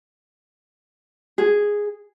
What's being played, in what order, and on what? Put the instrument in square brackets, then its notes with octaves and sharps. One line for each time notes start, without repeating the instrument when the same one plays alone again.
[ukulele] G#4